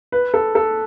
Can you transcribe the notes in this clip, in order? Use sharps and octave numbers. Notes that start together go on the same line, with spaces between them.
B4
A4
A4